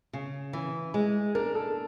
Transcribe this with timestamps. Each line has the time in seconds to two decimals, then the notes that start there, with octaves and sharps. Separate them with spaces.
0.13 C#3
0.53 E3
0.94 G#3
1.35 D4 A#4
1.55 A4